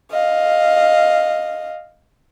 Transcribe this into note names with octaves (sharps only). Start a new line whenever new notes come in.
D#5 F5